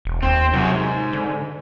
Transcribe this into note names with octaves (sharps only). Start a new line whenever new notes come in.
E1
D#2 C4
F#2 C3 F#3 G#4
G#2
D3